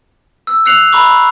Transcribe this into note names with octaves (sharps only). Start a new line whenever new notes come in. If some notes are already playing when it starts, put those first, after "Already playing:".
E6
E6 F#6 C7 C#7 F7 F#7
A#5 B5 C#6 D6 F#7
B5